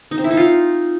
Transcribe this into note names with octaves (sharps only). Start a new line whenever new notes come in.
D#4
C4
E4
D#4
F4